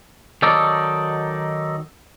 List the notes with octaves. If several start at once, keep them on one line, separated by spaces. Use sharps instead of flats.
D#3 F#3 D#4 A4 D5